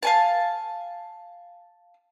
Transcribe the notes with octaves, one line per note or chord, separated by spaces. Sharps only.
F5 G#5 A5